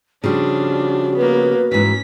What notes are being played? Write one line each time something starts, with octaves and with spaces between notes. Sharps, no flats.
C#3 F3 G3 D4 F#4
A#3 B3 B4
G#2 E3 C#4 B6